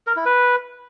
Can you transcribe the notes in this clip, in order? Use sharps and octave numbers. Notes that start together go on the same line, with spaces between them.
A#4
E4
B4